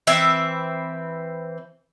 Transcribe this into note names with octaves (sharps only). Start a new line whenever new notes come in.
E3 C4 B4 E5